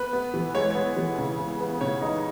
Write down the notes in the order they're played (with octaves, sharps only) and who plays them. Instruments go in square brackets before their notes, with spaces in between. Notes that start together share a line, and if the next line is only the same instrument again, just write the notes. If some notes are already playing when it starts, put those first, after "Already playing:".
Already playing: [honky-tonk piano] B3 [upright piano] B4
[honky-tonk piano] B3
E3
[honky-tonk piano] G#3 [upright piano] C#5
[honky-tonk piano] B3 [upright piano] C#5
[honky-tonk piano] E3
C#3
B3
B3
[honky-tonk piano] C#3 [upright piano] C#5
[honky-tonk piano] D#4